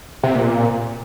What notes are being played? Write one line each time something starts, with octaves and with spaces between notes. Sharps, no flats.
C3
A#2